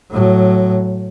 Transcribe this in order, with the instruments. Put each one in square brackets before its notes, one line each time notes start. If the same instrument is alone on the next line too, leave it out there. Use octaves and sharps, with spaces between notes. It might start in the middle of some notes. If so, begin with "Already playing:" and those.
[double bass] A2 F#3